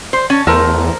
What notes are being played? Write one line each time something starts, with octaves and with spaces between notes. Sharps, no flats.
C5
C#4 A5
E2 A3 A#4 C5